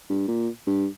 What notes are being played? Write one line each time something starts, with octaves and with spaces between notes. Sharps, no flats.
G2
A#2
G2